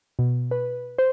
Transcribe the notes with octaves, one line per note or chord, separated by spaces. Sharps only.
B2
B4
C5